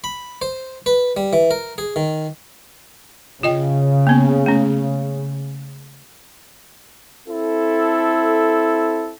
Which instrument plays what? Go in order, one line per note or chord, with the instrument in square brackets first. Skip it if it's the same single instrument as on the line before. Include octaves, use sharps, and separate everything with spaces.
[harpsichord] B5
C5
B4
G3
E3
A#4
G#4
D#3
[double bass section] C#3 [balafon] F4 D#5 G5
[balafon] A#3 B3
A3 C#4
[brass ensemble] C4 E4 A4